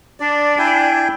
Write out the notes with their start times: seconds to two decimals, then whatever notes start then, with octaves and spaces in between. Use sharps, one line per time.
0.20 D4 D5
0.59 E4 G5 G#5